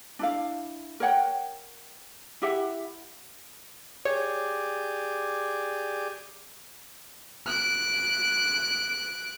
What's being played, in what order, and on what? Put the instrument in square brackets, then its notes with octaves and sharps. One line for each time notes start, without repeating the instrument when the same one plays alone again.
[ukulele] D4 E4 F5
A#4 C#5 F#5 G5
E4 G4 E5 F#5
[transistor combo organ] G4 G#4 D5 [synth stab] C#5
[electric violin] F#6 D7